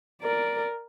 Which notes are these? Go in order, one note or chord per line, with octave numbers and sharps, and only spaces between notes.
A#4 D5